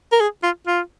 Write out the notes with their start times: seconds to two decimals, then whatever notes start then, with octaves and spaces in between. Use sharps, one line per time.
0.12 A#4
0.21 G#4
0.43 F4
0.67 F4